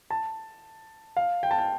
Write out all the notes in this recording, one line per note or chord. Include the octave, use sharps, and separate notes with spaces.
A5
F5
G5
A5
G5